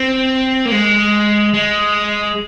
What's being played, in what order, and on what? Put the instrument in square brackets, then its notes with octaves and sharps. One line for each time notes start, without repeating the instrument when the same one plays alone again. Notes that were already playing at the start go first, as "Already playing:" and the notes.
Already playing: [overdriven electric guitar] C4
A#3
G#3
G#3